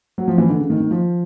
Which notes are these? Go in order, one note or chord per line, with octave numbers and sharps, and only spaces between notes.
F#3
F3
E3
D3
C#3
D#3
D#3
F3